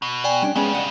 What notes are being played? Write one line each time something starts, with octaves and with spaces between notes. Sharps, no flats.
B2
D5 G5 G#5
G3 C#4 D4
C#3 G3 G#3 B3 C#4
D#5 F#5